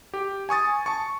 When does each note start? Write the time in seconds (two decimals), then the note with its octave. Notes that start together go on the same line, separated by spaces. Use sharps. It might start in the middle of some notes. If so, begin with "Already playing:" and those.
0.14 G4
0.49 G#5 C#6 D#6 A6
0.86 A5 C#6